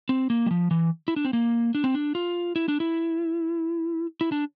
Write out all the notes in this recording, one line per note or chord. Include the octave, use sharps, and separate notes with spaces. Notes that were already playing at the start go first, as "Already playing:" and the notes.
C4
A#3
G3
F3
E3
E4
D4
C4
A#3
D4
C4
D4
F4
E4
D4
E4
E4
D4